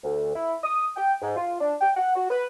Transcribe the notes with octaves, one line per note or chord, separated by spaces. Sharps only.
D2
E4
D#6
G5
G#2
F4
D4
G5
F#5
F#4
B4